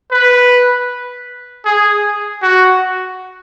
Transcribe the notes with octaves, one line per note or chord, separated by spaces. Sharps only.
B4
G#4
F#4